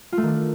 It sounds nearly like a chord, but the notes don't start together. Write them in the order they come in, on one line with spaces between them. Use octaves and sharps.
F4 A3 D#3 D4